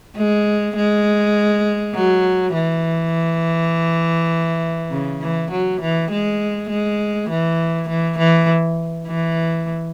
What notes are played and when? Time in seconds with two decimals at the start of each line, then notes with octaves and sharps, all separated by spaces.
0.16 G#3
0.76 G#3
1.94 F#3
2.54 E3
4.91 C#3
5.21 E3
5.51 F#3
5.81 E3
6.11 G#3
6.69 G#3
7.29 E3
7.89 E3
8.18 E3
9.07 E3